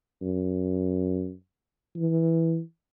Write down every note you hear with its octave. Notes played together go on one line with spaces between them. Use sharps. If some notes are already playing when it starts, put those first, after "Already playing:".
F#2
E3